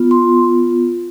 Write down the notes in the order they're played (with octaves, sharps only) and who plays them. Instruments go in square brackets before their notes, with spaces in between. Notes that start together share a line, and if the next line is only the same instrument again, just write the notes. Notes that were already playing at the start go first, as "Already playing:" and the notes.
Already playing: [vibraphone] B3 F4
C6